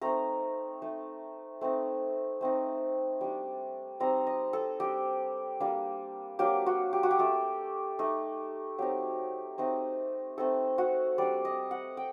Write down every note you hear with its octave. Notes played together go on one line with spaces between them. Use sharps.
A3 C4 D#4 A#5
A3 D#4
A3 C4 D#4
A3 C4 D#4
G3 D4
G3 C4 D#4 A#5
D#5
A4
G3 D4 G4
G3 A#3 D4
F#3 A#3 D4 G4
F#4
G4
F#4
G4
A3 D4 A4
A3 D#4
F#3 C4 D#4 G4
A3 C4 D#4
A3 C4 D#4 A4
F#4
G3 D4 D5
D#5
F#5
G5